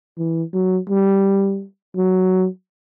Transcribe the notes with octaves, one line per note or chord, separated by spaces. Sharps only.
E3
F#3
G3
F#3